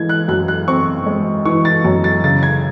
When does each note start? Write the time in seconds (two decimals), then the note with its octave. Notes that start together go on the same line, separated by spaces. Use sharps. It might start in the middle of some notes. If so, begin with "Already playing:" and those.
Already playing: E3 G#3 G#6
0.09 F#6
0.28 F#2 F#6
0.48 F#6
0.68 C4 C#6
1.06 G#3
1.45 E3 C#6
1.65 A6
1.85 F#2
2.04 A6
2.24 C#3 A6
2.43 G#6